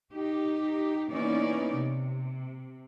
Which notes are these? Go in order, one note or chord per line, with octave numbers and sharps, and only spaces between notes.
D#4 G4
E3 A#3 B3 C#4 D#4 D5
C3